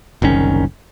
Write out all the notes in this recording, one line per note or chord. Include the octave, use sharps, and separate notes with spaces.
F#1 C2 D#3 C#4